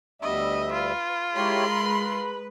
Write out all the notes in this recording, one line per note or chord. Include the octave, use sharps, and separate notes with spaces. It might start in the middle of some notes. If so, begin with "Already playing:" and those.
D2 G3 B3 D4 D#5 E5
F4 B4
G#3 E4 G4 A#4 C#5 B5 C6
B4